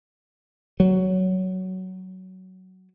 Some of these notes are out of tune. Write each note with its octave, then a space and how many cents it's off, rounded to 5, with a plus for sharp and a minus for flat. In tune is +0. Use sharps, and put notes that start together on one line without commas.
F#3 +10